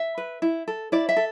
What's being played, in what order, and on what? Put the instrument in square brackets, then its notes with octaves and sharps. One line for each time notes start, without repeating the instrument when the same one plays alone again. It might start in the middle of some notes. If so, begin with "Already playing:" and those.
Already playing: [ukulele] E5
B4
E4
A4
E4 D5
E5
A4